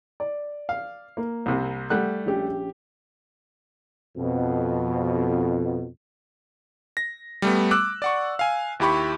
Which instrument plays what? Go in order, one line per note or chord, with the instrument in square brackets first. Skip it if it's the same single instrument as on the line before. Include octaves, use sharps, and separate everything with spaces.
[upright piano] D5
[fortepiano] F5
[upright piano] A#3
[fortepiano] C2 C3
[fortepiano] G3 A3 F#6 [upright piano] F#5
[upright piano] A#1 C#4 G4
[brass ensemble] F2 B2
[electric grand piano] A#6
G3 A3 B3
D6 E6 F#6
D5 F#5 C#6
F5 G#5
D#2 E4 G4 B5 C#6